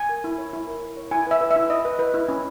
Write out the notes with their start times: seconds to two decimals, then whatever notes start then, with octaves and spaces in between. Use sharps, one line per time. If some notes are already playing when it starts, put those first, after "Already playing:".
Already playing: G#5
0.09 A#4
0.24 E4
0.38 C#5
0.53 E4
0.67 A#4
0.82 E4
0.97 C#5
1.11 E4 G#5
1.27 B4 E5
1.41 B4
1.51 E5
1.56 E4
1.70 E4 D#5
1.85 B4
1.99 B4
2.14 E4
2.28 C#4